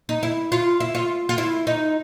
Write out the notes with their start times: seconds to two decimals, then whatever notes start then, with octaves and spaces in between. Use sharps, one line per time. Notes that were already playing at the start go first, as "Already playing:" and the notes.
0.09 D#4
0.23 E4
0.52 F4
0.80 E4
0.95 F4
1.29 F4
1.38 E4
1.67 D#4